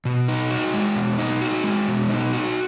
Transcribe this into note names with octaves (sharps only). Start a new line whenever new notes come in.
B2
D#4
F#4
G#3
B2
D#4
F#4
G#3
B2
D#4
F#4